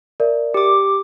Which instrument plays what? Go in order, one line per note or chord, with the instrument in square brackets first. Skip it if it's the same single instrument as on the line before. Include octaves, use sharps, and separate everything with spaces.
[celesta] A#4 D5 E5
[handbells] G4 D6